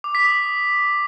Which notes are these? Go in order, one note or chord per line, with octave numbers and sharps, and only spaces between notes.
D6
B6
D#6